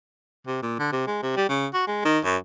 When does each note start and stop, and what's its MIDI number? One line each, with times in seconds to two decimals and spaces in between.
0.47 0.59 48
0.63 0.78 46
0.79 0.91 50
0.92 1.06 48
1.07 1.22 56
1.22 1.32 48
1.37 1.47 55
1.49 1.67 49
1.74 1.83 66
1.87 2.00 56
2.05 2.19 51
2.25 2.37 42